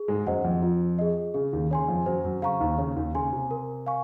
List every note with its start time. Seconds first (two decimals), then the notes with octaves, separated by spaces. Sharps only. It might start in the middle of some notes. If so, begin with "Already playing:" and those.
Already playing: G#4
0.08 G#2 G#3
0.26 F#2 F#3 C5 D#5 F#5
0.44 F2 F3
0.62 F4
0.99 G#4 D#5
1.34 C#3 G#4
1.53 D#2 D#3
1.70 C#3 C#5 G#5 C6
1.88 F2 F3
2.06 F#2 F#3 C5
2.24 F#2 F#3
2.42 C#3 F5 A#5 C#6
2.60 D#2 D#3
2.78 C#3 C#5
2.96 D#2 D#3
3.15 C#3 G#5 C6
3.33 C3
3.51 A#4
3.86 F5 G#5 C#6